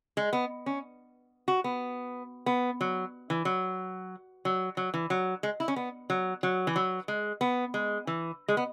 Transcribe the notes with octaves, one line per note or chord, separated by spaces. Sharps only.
G#3
B3
C#4
F#4
B3
B3
F#3
E3
F#3
F#3
F#3
E3
F#3
G#3
E4
C#4
B3
F#3
F#3
E3
F#3
G#3
B3
G#3
E3
G#3
B3